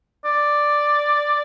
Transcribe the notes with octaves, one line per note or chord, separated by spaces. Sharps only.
D5